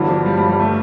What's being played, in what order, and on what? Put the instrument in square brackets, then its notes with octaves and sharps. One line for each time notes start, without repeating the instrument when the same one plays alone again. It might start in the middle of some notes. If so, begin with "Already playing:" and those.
Already playing: [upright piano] G1 G2 D3 F#3 [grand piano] E3
[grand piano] F3
G3
G3
G3
A3